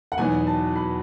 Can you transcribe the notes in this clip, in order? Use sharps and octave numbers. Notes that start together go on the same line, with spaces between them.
F#5
E2 B2 F#3 B3 D#4 G#5
A5
B5